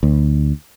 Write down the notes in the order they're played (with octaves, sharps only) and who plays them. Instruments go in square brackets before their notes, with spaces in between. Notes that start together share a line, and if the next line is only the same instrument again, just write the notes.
[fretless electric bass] D2